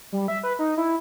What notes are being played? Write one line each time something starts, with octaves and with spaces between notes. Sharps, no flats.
G3
E5
B4
D#4
E4